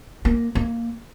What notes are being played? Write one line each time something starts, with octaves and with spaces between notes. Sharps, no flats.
A#3
A#3